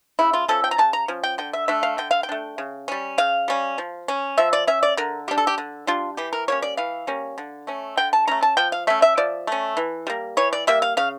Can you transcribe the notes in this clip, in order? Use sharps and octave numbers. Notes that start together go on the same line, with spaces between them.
C#3 E4
F4
F3 C#4 A4
G5
A#5
C#3 A5
A#5
F3 C#4
G5
D3 G5
E5
A3 D4 E5
F5
D3 G5
F5
G5
A3 D4
C#3
G3 C#4
C#3 F5
G3 C#4
F3
C#4
F3 E5
D5
C#4 E5
D5
D3 A#4
G3 D4 G4
A4
G4
D3
G3 D4 F4
E3 G4
A#4
G3 A#3 C#4 C#5
D5
E3 F5
G3 A#3 C#4
D3
A3 C#4
D3 G5
A5
A3 C#4 A#5
A5
F3 G5
F5
A3 C#4 E5
E5
F3 D5
A3 C#4
E3
G3 A#3
E3 C#5
D5
G3 A#3 E5
F5
C#3 F5